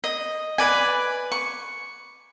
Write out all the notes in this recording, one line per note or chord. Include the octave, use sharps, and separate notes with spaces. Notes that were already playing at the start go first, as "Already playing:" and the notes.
D#5
B4 D5 G#5
C#6